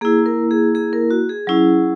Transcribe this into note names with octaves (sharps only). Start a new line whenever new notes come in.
A#3 E4 G#4
A#4
G#4
G#4
A#4
F#4
G#4
F#3 C#4 E4